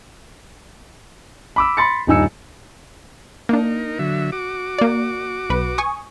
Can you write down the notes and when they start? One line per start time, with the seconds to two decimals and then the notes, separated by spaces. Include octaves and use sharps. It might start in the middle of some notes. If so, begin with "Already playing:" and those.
1.56 B5 D6 E6
1.77 B5 C6 A6 C#7
2.07 D#1 G2 D#4 G#5 E6 C#7
3.49 A#3 D4 D#4 A#4
3.99 D3 F#3 E5
4.32 F#4 D6
4.79 A#3 D5
5.50 B1 B4
5.78 G#5 C#6 D#6